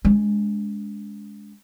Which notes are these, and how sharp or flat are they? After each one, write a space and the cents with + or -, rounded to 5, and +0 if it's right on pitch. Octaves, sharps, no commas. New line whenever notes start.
G#3 +0 D4 -40